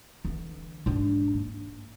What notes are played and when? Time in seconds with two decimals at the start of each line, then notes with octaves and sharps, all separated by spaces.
0.25 D3 E3
0.86 G#2 D4
1.34 A#3